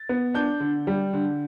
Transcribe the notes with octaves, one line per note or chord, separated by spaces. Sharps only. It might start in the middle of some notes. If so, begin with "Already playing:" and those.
Already playing: A6
B3
D4 G6
D3
G3
D3